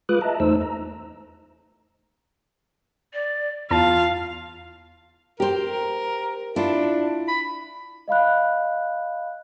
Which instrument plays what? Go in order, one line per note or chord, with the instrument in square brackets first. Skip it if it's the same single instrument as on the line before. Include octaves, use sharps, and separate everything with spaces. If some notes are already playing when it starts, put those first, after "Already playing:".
[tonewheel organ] G#3 F4 B4 D6 D#6 F#6
D#5 E5 A5 A#5
E2 A3 D#4 C5 E6
A#5
[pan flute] D5
[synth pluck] E2 A5 [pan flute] F4 [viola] F5
[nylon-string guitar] G4 C5 [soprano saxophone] A#4
[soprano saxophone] D4 [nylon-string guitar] E4 F4
[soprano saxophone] B5
[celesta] D#5 F5 B5 F#6